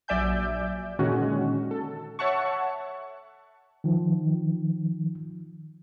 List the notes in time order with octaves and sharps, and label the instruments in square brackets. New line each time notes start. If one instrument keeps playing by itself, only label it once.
[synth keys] A#1 F#3 D5 E5 G#5 G6
A#2 D3 D#3 G#3 C#4 F#4
A4
C#5 E5 F#5 A5 C#6
[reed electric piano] D#3 F3